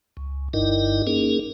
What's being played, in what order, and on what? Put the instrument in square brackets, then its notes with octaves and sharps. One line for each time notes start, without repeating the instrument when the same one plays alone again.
[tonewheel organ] C#2
G1 G2 D#4 E4 A#4 D#5
A#3 C#4 D#4 G#4 A#4